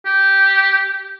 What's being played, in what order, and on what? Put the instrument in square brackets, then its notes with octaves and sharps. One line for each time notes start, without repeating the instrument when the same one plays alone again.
[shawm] G4